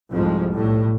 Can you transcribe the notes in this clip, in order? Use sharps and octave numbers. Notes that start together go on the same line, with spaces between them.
C2 F2 G#2 F3 G#3
B1 A2 G3